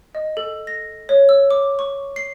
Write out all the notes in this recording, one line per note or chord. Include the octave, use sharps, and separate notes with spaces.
D#5
A4
A#6
C#5
E6
D6
C#6
C7